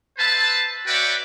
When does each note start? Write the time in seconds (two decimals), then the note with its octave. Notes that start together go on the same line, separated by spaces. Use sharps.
0.18 B4 C5 E5 A5
0.87 F#4 B4 C#5 D5 E5 G5